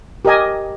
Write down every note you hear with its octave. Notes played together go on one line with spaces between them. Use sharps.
G4 A#4 D#5 G#5